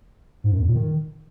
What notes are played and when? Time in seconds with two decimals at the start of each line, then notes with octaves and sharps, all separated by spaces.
0.44 G#2
0.52 F#2
0.59 E2
0.67 A#2
0.75 D#3